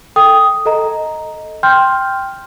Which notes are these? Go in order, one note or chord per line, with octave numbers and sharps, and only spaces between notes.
A4 G5 D#6
A4 D#5 A#5
G5 C6 F6 G6